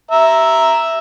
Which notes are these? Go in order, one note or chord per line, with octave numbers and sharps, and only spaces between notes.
E5 A#5